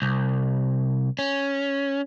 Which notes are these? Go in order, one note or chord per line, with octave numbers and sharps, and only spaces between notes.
C2
C#4